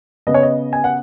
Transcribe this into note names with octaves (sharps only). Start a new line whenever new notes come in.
C#3 B3 D#5
C#5
D#5
G#5
F#5